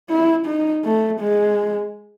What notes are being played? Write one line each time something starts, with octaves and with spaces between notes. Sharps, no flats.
E4
D#4
A3
G#3